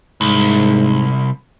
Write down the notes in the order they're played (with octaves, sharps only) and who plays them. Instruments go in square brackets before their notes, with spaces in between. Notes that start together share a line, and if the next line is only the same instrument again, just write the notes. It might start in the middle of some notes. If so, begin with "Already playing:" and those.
[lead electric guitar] C2 [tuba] G#2